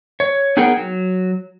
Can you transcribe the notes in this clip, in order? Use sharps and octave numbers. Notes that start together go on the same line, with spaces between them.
C#5
B3 D#4 G#4 A#4 F#5 G5
F#3